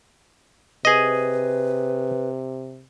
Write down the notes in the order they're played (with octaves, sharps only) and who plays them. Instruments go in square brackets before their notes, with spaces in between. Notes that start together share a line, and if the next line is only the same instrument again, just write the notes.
[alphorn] C3 [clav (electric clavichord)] G#4 D#5 [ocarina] B4